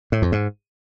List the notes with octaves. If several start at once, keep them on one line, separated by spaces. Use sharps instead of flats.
A2
F2
G#2